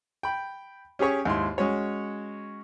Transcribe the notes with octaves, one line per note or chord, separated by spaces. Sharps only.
G5 B5
C#4 G4 G#4 C#5 C#6
D#2 G#2 E4 C6
G#3 C#4 F#4 C#5